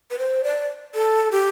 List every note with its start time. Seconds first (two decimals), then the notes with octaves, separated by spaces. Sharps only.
0.11 B4
0.19 C5
0.44 D5
0.94 A4
1.32 G4